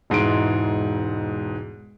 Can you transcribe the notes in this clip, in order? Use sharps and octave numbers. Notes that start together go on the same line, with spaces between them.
E1 G#2 E3 C6 D7